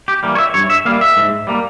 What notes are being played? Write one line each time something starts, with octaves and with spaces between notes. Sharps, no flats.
G4
E3 G3 A#3
C#5
E5
G2 C#5
E5
G3 A#3 F5
E5
G#2
G3 A#3